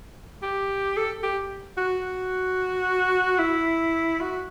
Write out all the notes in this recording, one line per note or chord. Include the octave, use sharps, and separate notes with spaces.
G4
A4
G4
F#4
E4
F#4